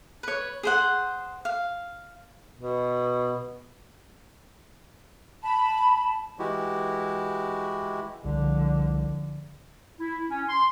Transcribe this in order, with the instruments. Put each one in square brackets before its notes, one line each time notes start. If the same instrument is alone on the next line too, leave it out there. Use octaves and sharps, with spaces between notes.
[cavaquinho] B4 C#5
G#4 C5 F#5
F5
[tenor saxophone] B2
[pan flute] A5 [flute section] B5
[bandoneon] E3 G#3 E4 F#4 G4
[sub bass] C2 [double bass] D3 F3
[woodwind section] E4
C#4
C6